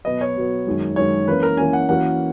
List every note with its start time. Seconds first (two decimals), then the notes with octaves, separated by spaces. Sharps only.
0.05 B2 F#3 B3 D#5
0.21 C#5
0.36 B2 F#3 B3
0.66 F#2 D#3 G#3
0.96 F#2 D#3 G#3 C#5
1.28 E3 A#3 C#4 B4
1.43 A#4
1.57 E3 A#3 C#4 G#5
1.73 F#5
1.89 E3 A#3 C#4 F#4 A#4 F#5